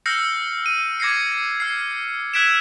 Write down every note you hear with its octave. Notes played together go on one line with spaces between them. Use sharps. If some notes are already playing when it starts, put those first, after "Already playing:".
E6 F6 G6 A#6 C7 C#7
D#7
D6 G#6 A#6 C7 C#7
F6 C7
E6 F#6 G#6 B6 D7 E7